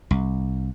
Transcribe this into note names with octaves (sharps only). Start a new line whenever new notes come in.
C2